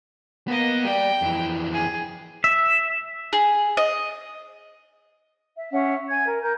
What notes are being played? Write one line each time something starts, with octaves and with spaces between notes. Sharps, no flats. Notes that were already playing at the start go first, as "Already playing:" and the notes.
A#3 B3 D#5
G3 D5 G5
F2 E3
G#4
E5
G#4
D#5
E5
C#4 E5 F#5
G#5 G#6
A#4
A#4 G6